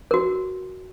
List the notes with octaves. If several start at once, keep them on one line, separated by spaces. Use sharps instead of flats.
F#4 A#4